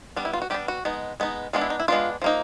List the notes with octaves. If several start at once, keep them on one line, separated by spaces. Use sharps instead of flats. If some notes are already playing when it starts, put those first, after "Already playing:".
G3 B3 D4
E4
F4
F#4
G3 B3 D4 G4
F#4
G#3 B3 D#4
G#3 B3 D#4
G#3 B3 D4 F4
E4
D#4
E4
G#3 B3 D4 F4
F3 A#3 D#4